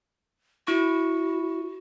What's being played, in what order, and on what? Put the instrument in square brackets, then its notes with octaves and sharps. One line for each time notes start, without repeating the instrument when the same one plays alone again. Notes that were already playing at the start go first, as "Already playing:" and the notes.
[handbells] E4 C#6 [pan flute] F#4